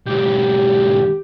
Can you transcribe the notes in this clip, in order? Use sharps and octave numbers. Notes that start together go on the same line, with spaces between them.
G#2 B2 G4